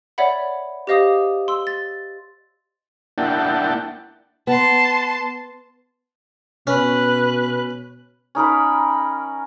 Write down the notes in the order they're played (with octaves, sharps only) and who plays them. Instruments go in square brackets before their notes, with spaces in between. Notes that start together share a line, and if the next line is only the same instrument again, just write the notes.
[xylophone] C#5 D5 E5 F#5 B5
G4 C5 D#5 F5 D6 D#6
C6 E6
A6
[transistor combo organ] A#3 D4 E4 F#5 G5 A5
[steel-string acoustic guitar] B3 [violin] A5 C6
[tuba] B2 [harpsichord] C#4 [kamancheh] B4 F#6
[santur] C#4 D#4 A#4 B5